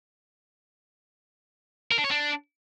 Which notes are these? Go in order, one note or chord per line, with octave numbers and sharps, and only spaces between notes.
A#4
D4
C#5
D4